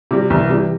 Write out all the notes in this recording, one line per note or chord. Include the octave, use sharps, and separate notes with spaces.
C3 G3
C2 E3
C3 G3